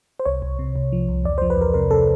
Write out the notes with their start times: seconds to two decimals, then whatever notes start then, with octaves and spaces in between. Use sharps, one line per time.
0.20 C5
0.26 C2 C#5
0.42 C2
0.59 C3
0.76 C2
0.92 F3
1.08 C2
1.24 E2 D5
1.38 F3 C5
1.50 B4
1.57 E2 A#4
1.74 C3 A#4
1.91 C3 A4